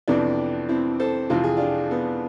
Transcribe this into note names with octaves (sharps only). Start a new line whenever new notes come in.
F2 C3 E3 B3 D4
C4 E4
A4 C5
F2 C3 E3 F4
G#4
D4 F4
B3